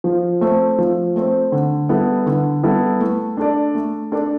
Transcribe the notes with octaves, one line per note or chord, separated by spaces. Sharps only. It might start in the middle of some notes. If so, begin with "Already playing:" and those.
F3
A3 C4
F3
A3 C4
D3
G3 B3 E4 A4
D3
G3 B3 E4 A4
A3
D4 A4 D5
A3
D4 A4 D5